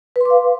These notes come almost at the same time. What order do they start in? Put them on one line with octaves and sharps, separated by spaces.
B4 C6 D6 F5